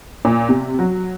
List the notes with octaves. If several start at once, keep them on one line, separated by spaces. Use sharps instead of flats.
A#2
C3
F#3